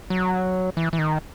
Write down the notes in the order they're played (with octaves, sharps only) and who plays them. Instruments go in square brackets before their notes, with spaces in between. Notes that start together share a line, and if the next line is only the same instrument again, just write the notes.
[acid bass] F#3
E3
E3
D#3